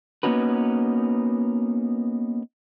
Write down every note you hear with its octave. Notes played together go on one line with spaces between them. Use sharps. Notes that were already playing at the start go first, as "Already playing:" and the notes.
A#3 B3 C#4 D#4 F#4 B4